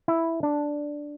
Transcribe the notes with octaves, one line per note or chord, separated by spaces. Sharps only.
E4
D4